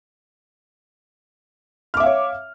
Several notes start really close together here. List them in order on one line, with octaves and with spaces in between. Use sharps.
F6 D6 E5 F5 C#5